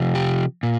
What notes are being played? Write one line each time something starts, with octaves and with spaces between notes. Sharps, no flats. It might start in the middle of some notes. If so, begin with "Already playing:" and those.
Already playing: C3 F3
G4
A#2